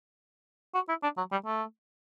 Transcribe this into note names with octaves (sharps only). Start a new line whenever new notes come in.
F#4
E4
D4
F#3
G3
A3